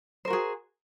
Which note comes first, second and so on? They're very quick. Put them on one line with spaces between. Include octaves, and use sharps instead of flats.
C5 A#4 F#4 G#4